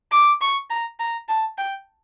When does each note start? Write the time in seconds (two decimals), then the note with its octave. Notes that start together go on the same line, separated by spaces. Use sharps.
0.12 D6
0.41 C#6
0.70 A#5
0.99 A#5
1.29 A5
1.58 G5